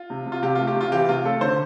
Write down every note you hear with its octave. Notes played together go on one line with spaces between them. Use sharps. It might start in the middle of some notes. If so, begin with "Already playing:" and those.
Already playing: F4
C3
C3
F4
C3 G4
A3 F4
G4
C3
F4
E3 G4
C3 F4
A3 A4
D3 C5